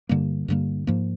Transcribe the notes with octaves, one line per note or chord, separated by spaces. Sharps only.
G2 D3 G3 A#3
G2 D3 G3 A#3
G#2 F3 A#3